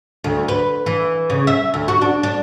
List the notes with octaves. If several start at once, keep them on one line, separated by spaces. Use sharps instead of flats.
D2
B4
E3
C#3
E5
D2
F#4
D4
D4